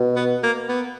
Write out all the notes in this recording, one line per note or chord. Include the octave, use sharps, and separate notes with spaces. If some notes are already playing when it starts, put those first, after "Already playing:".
Already playing: B2
B3
A#3
B3